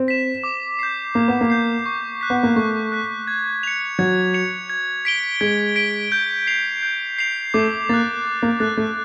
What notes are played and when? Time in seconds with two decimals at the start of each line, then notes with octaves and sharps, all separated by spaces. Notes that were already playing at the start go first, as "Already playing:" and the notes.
Already playing: C4
0.08 B6 E7
0.44 D6
0.79 G6 C7
1.14 A#3 D6
1.28 B3
1.41 A#3
1.50 G6 C7
1.86 C#6
2.21 F#6 B6
2.30 B3
2.43 A#3
2.56 A3 C#6
2.92 F#6 B6
3.27 G#6
3.63 C#7 F7
3.99 F#3 G#6
4.34 C#7 F7
4.70 G#6
5.05 B6 D7 G7
5.41 G#3 G#6
5.76 B6 D7 G7
6.12 G6
6.47 C7 F7
6.83 G6
7.18 C7 F7
7.54 A3 D6
7.89 A#3 F#6 A6
8.25 D6
8.43 A#3
8.60 A3 F#6 A6
8.77 A3